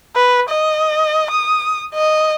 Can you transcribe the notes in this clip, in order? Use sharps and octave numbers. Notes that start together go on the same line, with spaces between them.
B4
D#5
D#6
D#5